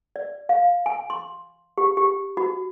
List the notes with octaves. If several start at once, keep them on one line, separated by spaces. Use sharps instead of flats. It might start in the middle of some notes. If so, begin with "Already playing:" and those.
D5
F5
G#5
C6
G4
G4
F#4